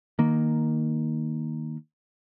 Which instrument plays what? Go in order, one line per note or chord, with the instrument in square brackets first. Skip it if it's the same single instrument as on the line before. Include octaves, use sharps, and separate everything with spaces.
[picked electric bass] D#3 A#3